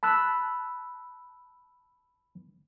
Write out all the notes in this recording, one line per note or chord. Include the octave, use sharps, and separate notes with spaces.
A5 B5 E6 F#6